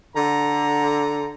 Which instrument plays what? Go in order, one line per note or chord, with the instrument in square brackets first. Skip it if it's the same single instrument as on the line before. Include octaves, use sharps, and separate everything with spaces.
[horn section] D3 A#5